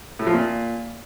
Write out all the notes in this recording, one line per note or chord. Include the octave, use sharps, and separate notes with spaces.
A2
F3
A#2